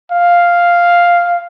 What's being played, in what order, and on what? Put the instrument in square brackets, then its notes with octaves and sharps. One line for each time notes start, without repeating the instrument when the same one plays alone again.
[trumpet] F5